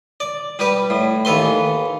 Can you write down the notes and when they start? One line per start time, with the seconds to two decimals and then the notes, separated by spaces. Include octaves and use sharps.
0.20 D5
0.59 G3 G4 B4
0.90 A2
1.25 D#2 E3 A4 B4 C6